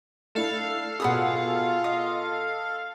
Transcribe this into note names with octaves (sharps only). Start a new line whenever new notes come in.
A3 D4 E4 A4 F5
B2 F4 G#4 F#5 B5 D#6
D#5 D#6